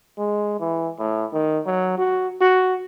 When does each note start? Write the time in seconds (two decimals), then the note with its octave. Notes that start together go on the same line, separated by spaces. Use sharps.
0.18 G#3
0.60 E3
0.99 A2
1.33 D#3
1.66 F#3
1.98 F#4
2.41 F#4